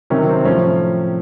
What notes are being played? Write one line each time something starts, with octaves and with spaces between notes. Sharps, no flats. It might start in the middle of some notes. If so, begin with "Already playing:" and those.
C3 D#3 F#3 C#4
C4
A2 F3 C#4